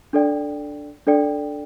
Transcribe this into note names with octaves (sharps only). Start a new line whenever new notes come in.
D4 A4 D5 G5
D4 A4 D5 G5